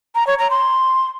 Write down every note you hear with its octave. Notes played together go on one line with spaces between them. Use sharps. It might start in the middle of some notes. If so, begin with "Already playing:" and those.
A#5
C#5
A#5
C6